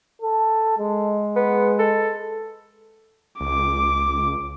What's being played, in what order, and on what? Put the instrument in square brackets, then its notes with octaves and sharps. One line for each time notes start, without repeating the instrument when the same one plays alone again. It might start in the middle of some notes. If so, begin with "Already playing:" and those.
[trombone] A4
G#3
[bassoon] B3
A4
[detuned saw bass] C#2 [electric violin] D6